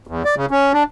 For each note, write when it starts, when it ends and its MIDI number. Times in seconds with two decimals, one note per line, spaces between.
0.07 0.23 40
0.25 0.35 74
0.37 0.46 49
0.51 0.72 61
0.73 0.83 62